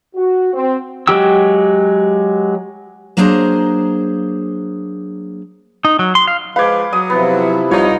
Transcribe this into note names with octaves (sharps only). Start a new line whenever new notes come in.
F#4
C4
F#3 G#3 G4 G5 E6
F#3 A#3 D4 G#4 C5 A#5
D#4
F#3
C6
F5
F3 G#3 B4 F5 D6 G#6
F#3 D#6
C3 F3 B3 E4
C2 D#4 F4 C#5